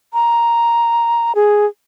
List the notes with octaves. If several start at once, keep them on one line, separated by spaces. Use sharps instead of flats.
A#5
G#4